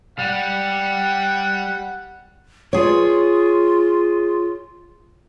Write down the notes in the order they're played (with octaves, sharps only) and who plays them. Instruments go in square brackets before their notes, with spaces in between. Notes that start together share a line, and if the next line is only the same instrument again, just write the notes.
[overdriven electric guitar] G3 [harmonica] F#5 G5
[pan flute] F4 [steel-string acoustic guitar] G#4 C#5